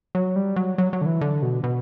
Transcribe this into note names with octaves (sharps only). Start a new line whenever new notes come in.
F#3
G3
F#3
F#3
F#3
D3
E3
D3
B2
B2